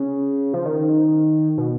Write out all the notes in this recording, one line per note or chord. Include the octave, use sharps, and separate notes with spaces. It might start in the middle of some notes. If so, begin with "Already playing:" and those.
Already playing: C#3
F3
D#3
B2